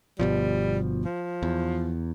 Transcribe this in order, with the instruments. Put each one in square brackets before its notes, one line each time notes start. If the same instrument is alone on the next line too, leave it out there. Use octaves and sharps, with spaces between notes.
[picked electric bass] G1 B2 F3 [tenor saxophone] G3
[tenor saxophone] F3
[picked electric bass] E2